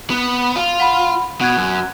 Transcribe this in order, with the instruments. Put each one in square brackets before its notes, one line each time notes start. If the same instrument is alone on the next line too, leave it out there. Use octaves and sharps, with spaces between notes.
[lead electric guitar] B3
F4
[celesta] F#5 B5
[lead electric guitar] B2 [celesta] F#5 F#6 G#6
[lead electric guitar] F#2